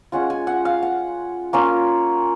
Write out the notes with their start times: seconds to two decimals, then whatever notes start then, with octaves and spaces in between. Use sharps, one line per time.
0.12 G#3 C#4 F4 F#5
0.30 G#5
0.47 F#5
0.65 F5
0.83 F#5
1.53 A#3 C#4 F4